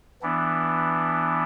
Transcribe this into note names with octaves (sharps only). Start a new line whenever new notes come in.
E3 B3 D4